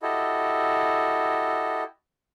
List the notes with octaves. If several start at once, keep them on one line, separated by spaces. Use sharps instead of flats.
E4 F#4 G4 A4 D#5